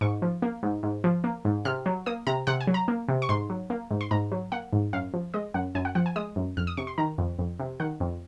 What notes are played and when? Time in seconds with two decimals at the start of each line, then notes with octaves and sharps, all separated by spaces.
0.01 G#2 C#6
0.22 F3
0.42 A#3
0.63 G#2
0.83 G#2
1.04 F3
1.24 A#3
1.45 G#2
1.65 C3 F6
1.86 F#3
2.06 A#3 D#6
2.27 C3 A#5
2.47 C3 F#5
2.61 G#5
2.67 F#3
2.74 A#5
2.88 A#3
3.08 C3
3.22 C#6
3.29 G#2 C6
3.50 F#3
3.70 A#3
3.91 G#2
4.01 C6
4.11 G#2 A#5
4.32 F#3
4.52 A#3 F#5
4.73 G#2
4.93 F#2 F5
5.14 F3
5.34 G#3 D#5
5.54 F#2 F#5
5.75 F#2 G#5
5.85 F#5
5.95 F3 F#5
6.06 G#5
6.16 G#3 D#6
6.36 F#2
6.57 F2 F6
6.67 D#6
6.77 C3 C#6
6.87 C6
6.98 D#3 A#5
7.18 F2
7.39 F2
7.60 C3
7.80 D#3 F#5
8.00 F2